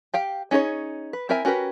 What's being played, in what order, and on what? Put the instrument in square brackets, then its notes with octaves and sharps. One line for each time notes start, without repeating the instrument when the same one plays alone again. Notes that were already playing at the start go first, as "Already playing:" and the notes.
[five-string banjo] G4 F5 G5
C#4 D#4 G#4 A#4 C#5
B4
C4 E4 A#4 E5 G#5
C#4 F#4 G4 A#4 B4